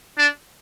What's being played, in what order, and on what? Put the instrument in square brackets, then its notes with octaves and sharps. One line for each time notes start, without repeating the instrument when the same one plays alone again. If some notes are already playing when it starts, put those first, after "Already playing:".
[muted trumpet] D4